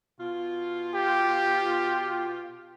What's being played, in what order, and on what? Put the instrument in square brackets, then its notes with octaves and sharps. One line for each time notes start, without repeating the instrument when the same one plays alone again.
[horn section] B2 F4
[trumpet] G4